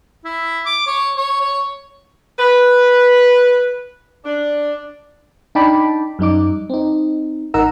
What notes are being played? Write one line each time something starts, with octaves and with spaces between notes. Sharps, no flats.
E4
D6
C#5
C#5
C#5
B4
D4
D4 D#4 G5 A5 B5 D6
F#2 G3 D#4 D6
C4 D#4
A1 D#4 A#4 F#5 A#5 E6